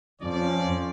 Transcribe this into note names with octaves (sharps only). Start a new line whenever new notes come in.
F2 F3 C#4 D5